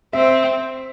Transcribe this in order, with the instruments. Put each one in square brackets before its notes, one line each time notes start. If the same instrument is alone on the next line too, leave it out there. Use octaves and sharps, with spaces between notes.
[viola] C4 [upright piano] E5